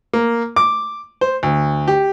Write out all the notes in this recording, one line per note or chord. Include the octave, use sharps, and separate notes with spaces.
A#3
D6
C5
D2
G4